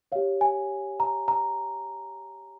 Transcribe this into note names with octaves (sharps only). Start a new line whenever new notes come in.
G4 C#5 F5
G#5
A#5
A#5